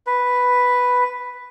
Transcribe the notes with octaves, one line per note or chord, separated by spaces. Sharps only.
B4